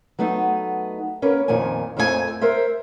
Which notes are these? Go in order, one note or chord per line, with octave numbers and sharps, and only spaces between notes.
F#3 A3 B3 D#4
A#3 C#4 A#4 B4
F2 A#2 D#3 F3 G#5
F2 A#2 F3 A3 F#4 G#5
A#4 C5 E5